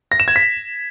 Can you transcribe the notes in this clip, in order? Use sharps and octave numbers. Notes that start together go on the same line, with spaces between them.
A#6
E7
G#6
B6